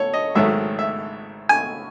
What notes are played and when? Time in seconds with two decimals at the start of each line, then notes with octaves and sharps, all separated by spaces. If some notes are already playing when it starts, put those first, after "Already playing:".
Already playing: A4 C#5
0.14 D#5
0.35 G#1 G#2 D#3 F#3 A3 E5
0.79 E5
1.49 G#5